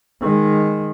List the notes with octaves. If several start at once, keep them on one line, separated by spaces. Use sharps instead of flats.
D#3 G#3